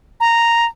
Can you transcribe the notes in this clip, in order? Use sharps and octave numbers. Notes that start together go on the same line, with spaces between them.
A#5